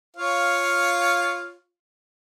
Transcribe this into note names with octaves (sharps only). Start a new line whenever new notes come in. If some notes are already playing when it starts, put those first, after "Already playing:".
F4 C#5 F5